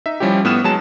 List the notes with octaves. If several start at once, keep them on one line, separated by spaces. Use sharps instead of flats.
D#4 E5
F3 G3 C#4 E4 G4
A2 B3 B4 D#6 F6 E7
F#3 G#3 A5 E7